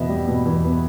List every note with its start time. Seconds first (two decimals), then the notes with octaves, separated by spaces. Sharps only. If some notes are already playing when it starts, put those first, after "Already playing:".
Already playing: E2 B2 B3 D#5 E5
0.09 G3
0.28 B2
0.45 E2
0.64 B3